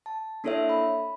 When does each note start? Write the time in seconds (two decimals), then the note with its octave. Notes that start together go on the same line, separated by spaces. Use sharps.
0.06 A5
0.44 A#3 D4 E4 A4 C#5 E5
0.69 B5